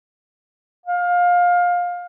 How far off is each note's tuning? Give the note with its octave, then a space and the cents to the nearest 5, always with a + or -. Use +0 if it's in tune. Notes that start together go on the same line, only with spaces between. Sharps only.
F5 +20